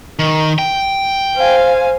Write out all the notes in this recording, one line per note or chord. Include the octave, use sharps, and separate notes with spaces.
D#3
G5
C5 F5 G#5